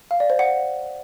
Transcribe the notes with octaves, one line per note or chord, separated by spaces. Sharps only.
F5
D5
C5
F#5